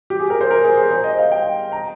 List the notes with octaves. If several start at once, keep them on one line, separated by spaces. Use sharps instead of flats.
G4
G#4
A#4
C5
A#4
G#4
C5
C5
D#5
F5
G5
A#5